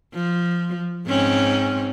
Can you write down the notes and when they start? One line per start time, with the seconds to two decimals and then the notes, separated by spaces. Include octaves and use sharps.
0.14 F3
1.07 G#2 C4 C#4